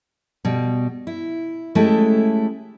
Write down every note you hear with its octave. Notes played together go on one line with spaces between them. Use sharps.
B2 G3
E4
G#3 A3 C#4 E4 G4 A4